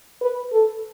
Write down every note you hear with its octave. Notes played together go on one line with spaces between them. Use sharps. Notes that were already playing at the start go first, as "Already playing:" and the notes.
B4
A4